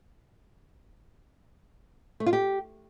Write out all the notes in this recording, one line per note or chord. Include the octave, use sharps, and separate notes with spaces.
A3
F4
G4